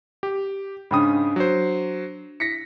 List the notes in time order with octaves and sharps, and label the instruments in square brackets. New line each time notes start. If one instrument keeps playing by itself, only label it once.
[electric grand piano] G4
[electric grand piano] G#2 C#3 D#6 [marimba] D4 G5 B5
[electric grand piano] F#3 C5
[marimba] E4 [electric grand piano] A#6 B6 C#7